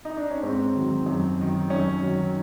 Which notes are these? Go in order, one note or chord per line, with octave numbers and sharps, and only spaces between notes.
D#4
D4
C#4
G#2 C4
D#3 F#3
F#2
D#3 F#3
F#2 C#4
D#3 F#3